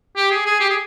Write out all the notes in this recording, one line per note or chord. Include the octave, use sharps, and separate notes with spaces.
G4
G#4
G#4
G4
G#4